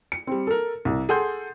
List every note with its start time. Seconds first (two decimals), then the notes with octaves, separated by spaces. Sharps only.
0.12 C#7
0.27 G3 C4
0.47 A4 A#4
0.85 C2
1.09 G#4 A4 F#5 C6 G6